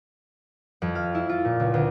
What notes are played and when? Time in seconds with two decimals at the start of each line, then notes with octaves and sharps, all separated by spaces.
0.82 F2
0.95 F5
1.15 E4
1.29 F4
1.45 A#2
1.60 C#2
1.74 D2